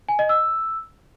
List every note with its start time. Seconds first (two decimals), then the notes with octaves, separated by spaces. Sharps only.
0.09 G#5
0.19 D#5
0.29 E6